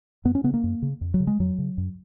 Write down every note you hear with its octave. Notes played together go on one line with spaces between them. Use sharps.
F#2 B3
C#4
C#3 B3
A#3
F#2
C#3
F2
F#3
C#3
G#3
F2 F#3
C#3
F#2